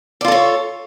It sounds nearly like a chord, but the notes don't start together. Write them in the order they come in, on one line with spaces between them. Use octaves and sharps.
D5 F4 A4 C#5